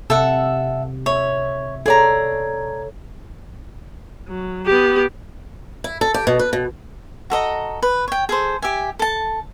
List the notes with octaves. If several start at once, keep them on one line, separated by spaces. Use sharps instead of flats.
C3 A4 E5 F#5
C#5 E5
G#4 A4 C#5 D5 A#5
F#3
B3 G4
E4
A4
G4
B2
B4
B2
F#4 A4 D#5 A#5
B4
C#5 G5
G#4 A4 C5
G4 E5 G#5
A4 A5